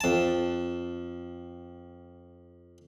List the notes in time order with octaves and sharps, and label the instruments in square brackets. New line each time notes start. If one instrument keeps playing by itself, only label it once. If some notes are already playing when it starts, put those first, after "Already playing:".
[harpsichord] F2 A5